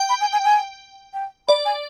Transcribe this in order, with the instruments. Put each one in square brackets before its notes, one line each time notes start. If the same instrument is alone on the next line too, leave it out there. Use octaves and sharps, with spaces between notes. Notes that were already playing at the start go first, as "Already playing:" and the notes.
Already playing: [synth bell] G5
[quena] B5
G#5
G#5
G#5
G5
[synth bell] D5 [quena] B5
[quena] G#5